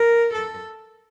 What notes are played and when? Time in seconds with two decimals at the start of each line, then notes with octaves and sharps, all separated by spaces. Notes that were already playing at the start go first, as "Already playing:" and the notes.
Already playing: A#4
0.34 A4